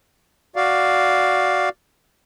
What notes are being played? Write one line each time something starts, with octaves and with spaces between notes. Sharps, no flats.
F#4 D5 F5